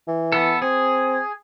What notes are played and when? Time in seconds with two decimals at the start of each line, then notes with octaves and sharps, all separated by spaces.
0.08 E3
0.32 B3 A4
0.62 C4 G#4